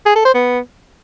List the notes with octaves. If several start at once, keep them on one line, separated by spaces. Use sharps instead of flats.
G#4
A4
C5
B3